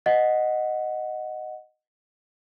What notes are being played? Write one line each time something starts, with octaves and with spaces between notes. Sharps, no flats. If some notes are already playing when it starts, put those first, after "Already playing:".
D#5 F#5